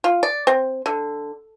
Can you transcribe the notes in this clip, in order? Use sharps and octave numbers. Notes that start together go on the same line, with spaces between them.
F4
D5
C4
D3